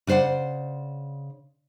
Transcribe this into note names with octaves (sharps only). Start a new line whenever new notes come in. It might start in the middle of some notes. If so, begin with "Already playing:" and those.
C#3 B4 C5 D5 F#5